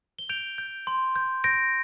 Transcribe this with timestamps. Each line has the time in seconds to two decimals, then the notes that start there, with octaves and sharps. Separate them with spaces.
0.19 G7
0.29 G6 D7 F7
0.58 G6
0.87 C6
1.16 G6
1.44 G6 A#6 D7